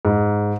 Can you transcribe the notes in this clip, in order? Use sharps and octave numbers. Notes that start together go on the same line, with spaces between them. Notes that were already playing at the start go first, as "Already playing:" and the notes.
G#2